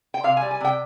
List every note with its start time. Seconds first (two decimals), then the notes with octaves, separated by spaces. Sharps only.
0.14 G5
0.24 C3 F5
0.37 G#5
0.42 G3
0.51 G#5
0.61 C3 G5